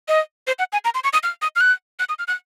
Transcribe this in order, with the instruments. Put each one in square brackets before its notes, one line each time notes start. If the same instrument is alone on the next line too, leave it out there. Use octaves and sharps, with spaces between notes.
[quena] D#5
C5
F#5
G#5
A#5
C6
C#6
D#6
F6
D#6
F6
F#6
F#6
D#6
F6
F#6